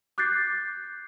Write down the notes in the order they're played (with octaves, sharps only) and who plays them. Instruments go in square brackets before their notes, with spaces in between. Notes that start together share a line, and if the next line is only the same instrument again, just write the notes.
[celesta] D6 F#6 G6 A6 C7